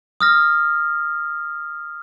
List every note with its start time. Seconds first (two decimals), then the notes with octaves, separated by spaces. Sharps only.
0.20 D#6 F6 A#6